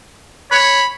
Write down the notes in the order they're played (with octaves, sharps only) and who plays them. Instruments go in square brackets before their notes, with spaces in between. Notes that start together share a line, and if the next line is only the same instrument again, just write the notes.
[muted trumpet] C#5 [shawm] B5